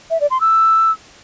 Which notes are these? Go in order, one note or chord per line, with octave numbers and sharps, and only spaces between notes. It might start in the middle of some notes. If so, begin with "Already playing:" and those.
E5
D5
C6
E6